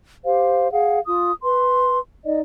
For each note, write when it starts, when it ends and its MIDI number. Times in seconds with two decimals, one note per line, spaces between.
0.25 0.70 67
0.25 0.70 72
0.25 0.70 77
0.72 0.99 68
0.72 0.99 77
0.72 0.99 78
1.06 1.32 65
1.06 1.32 87
1.43 1.98 71
1.43 1.98 84
2.25 2.40 63
2.25 2.40 74
2.25 2.40 75